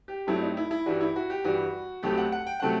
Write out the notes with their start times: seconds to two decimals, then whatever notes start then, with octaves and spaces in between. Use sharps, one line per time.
0.08 G4
0.27 G2 F#3 A3 C4 E4
0.42 D#4
0.57 E4
0.71 E4
0.86 G2 E3 G3 F#4
1.00 E4
1.16 F#4
1.30 G4
1.44 G2 E3 G3 F#4
2.03 C2 C3 F#3 A3 C4 G4
2.18 F#5
2.32 F#5
2.47 G5
2.60 C3 F#3 A3 C4 F#5